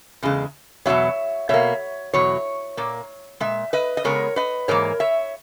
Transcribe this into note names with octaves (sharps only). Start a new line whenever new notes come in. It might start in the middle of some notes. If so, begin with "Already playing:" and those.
E2 C#3 G#3
E2 B2 F#3 B3 C#5 E5
B2 A#3 C#5 E5
E2 B2 F#3 C#5
A#2 A#3
A#2 G#3 E5
B4 D#5
D#5
C#3 G#3 B3 A#4 C#5
B4 D#5
G#2 E3 A#3 A#4 C#5
C#5 E5